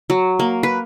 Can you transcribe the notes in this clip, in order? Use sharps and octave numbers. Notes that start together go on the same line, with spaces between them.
F#3
A#3
B4